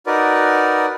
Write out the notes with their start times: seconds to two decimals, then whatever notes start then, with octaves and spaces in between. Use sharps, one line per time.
0.07 D#4 F#4 A#4 B4 D5